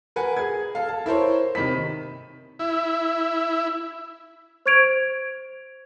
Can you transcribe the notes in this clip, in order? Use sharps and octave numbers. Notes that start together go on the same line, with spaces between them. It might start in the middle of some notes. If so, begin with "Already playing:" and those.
A#4 B4 F#5 G#5
G#4 G#6
A4 F5
A5
E4 A#4 C5 C#5
C3 D#3 B5 B6
E4
C5 C#6 G#6 D7 F7